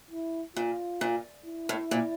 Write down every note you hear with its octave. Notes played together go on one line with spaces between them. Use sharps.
E4
A#2 F4
A#2
E4
A2
A#2